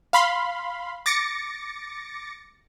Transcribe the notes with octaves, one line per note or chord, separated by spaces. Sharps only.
F5 B5 C6
D6 A6 A#6 C#7